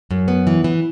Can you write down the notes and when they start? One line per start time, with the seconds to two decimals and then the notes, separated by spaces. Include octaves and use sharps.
0.11 F#2
0.28 B3
0.47 E3
0.64 E3